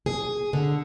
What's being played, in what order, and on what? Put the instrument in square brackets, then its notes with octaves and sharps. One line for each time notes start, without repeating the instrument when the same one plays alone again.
[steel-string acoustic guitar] G#4
D3